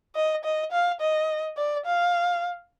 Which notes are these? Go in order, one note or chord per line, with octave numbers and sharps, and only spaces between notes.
D#5
D#5
F5
D#5
D5
F5